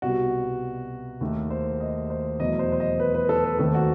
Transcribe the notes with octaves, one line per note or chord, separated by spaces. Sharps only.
C2 B2 G3 F#4
D#2 D#3 A3
C5
D#5
C5
E2 B2 F#3 A3 D#5
C5
C5
D#5
B4
B4
A4
B4
D#2 D#3 A3 C4 A4
F#4